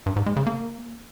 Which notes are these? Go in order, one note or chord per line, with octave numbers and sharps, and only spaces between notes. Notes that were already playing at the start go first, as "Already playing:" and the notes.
G2
G#2
G#3
C#3
A#3